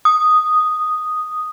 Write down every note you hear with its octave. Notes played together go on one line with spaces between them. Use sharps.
D#6